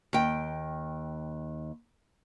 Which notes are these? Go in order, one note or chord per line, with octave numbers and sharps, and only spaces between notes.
D#2 G5